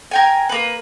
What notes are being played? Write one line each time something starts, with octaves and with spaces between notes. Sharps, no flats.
A#4 G5 G#5
A#3 B4